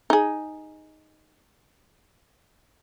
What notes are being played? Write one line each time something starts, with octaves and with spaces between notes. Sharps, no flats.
D#4 G#4